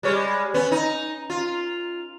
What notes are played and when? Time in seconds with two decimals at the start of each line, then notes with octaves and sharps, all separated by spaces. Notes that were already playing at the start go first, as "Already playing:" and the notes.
0.03 G3 G#3 C#5
0.54 B3 C#4
0.72 D#4
1.30 F4